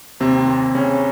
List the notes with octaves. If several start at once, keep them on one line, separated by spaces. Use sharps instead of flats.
D#2 C3 C4
D#2
C#3 C#4